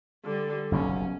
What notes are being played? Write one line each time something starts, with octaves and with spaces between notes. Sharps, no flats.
D3 G3
F#1 B1 B2 C#4